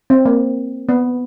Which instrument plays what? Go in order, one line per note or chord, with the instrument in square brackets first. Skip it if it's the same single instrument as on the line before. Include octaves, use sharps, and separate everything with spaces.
[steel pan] C4
A#3
B3